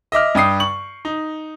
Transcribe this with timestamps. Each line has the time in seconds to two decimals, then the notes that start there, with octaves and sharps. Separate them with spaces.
0.12 D#5 E5 D6 F6
0.35 G2 G5 D#6 C7
0.60 C#6 F#7
1.05 D#4